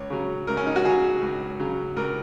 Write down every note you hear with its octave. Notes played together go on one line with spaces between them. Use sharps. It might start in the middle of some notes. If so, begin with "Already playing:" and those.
Already playing: C#2 C#5
C#3 F#3
C#2 A#4
C#4
D#4
F#4
C#3 F#3 G#4
C#2
C#3 F#3
C#2 A#4